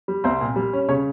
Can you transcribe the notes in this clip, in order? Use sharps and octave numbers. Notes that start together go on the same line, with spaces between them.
G3
C2 C4 C5
A#2
G3
C#4
C#3 C#4 C#5